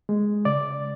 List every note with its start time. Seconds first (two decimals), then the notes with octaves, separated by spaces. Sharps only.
0.09 G#3
0.45 C#3 D5